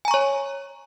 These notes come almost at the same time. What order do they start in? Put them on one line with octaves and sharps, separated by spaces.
G#5 A#5 C#6 C#5